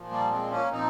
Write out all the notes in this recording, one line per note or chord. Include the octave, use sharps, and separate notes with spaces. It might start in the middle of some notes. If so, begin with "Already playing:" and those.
Already playing: A#2 F3
G3 A#3
G#3 C4
A#3 C#4
A#2 F3 C4 D#4